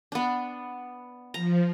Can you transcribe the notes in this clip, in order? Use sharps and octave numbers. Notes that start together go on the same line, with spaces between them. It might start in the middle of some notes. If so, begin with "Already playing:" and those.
B3 D4
F3 A#5